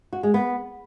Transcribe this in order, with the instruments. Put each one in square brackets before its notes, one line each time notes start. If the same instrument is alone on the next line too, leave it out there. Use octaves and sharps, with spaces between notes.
[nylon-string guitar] F#4
G#3
B3